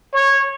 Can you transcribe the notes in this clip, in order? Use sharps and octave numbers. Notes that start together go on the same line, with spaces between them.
C#5